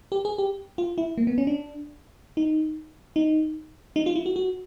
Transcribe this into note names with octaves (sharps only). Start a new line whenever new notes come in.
G4
G#4
G4
F4
E4
A#3
B3
C#4
D4
D#4
D#4
D#4
F4
E4
F#4
F#4